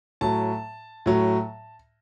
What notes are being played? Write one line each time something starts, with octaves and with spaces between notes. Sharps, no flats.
A2 F#3 A5
A2 F#3